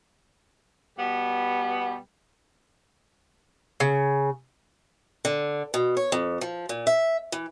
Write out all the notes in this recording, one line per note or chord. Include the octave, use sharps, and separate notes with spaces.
B2 G3 B3
C#3
D3
B2
C#5
F2
F3
A#2
E5
E3